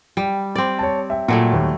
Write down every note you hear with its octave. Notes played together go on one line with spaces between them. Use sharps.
G3 G5
C4 D5
C#5 A5
E5 G5
A#2 F#3 G3 A3
D#2